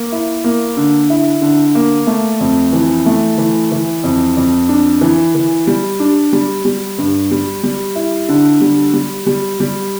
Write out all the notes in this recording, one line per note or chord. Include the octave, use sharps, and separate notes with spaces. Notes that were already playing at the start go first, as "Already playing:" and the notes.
Already playing: A#3
E4
A#3
D3
E4
D3
A#3
A3
F2
E3
A3
E3
E3
F2
F2
D4
E3
E3
G3
D4
G3
G3
G2
G3
G3
E4
D3
G3
G3
G3
G3